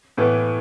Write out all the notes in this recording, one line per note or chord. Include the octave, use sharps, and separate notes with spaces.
A2 E3 B3